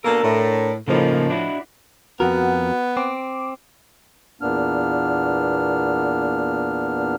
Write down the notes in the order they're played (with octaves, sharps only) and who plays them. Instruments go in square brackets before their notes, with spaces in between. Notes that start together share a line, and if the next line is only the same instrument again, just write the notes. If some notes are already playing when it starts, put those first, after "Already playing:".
[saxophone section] B2 A#3 A4 [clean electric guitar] D4 A#4
[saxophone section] A2
[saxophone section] A2 F3 [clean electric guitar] C#3 A#3 D#4
[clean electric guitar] D4 E4 F#4
[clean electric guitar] F2 A#4 [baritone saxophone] B3 [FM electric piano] F#4 F#5
[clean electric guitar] C4 [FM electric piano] D6
[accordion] E2 A#2 A#3 B3 D4 F6